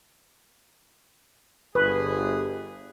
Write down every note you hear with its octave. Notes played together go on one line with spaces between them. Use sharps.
G1 G#4 B4